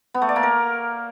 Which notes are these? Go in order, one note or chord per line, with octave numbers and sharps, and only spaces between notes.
B3
A3
D5
A#3
A#4